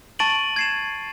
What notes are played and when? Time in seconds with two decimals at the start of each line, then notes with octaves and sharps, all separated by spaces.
0.19 A5 C#6 A6 D7 D#7 F#7
0.56 G#6 C7 E7